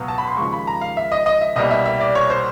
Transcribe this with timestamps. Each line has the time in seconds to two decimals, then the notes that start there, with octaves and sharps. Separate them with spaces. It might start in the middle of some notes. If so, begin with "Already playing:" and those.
Already playing: C#2 B2 F#3 B3
0.08 A5
0.18 B5
0.28 C6
0.37 D#2 C#3 F3 G#3 C#6
0.53 B5
0.67 A#5
0.81 F5
0.97 E5
1.12 D#5
1.26 D#5
1.41 E5
1.56 C2 B2 G3 A#3 D#5
1.71 E5
1.86 E5
2.01 D5
2.15 C#5
2.30 C5